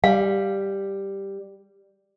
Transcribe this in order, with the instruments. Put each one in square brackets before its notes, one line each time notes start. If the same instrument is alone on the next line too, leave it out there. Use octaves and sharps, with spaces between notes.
[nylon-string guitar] G3 [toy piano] F5